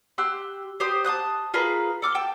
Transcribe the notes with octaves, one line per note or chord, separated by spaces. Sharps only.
G4 C6 E6 F#6
G4 C5 D#6
A5 C6 D#6 F#6
F4 G#4 A#4 B4
A4 D6 F6
G5 A5